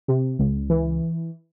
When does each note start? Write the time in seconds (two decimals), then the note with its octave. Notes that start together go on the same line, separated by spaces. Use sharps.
0.08 C3
0.39 C#2
0.70 E3